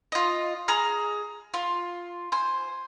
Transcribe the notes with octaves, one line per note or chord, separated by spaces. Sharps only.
F4 D#5
G#4 A#5 F6
F4
C5 G#5